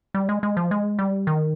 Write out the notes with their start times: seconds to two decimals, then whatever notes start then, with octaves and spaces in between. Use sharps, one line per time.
0.14 G3
0.29 G#3
0.43 G#3
0.57 F3
0.71 G#3
0.99 G3
1.27 D#3